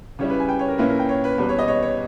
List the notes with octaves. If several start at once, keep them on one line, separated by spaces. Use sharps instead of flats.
C#3 G3 C#4 E4 C#5
B4
G#5
G5
C#5
A#4
A#2 A#3 C#4 E4 B4
A#4
G5
C#5
B4
E2 B2 G3 B4
C#5
D#5
C#5
C#5